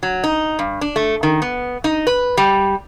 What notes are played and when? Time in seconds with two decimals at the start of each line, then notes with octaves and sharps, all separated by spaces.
0.03 F#3
0.24 D#4
0.59 G2
0.81 D4
0.96 A3
1.23 D#3
1.42 B3
1.84 D#4
2.07 B4
2.37 G3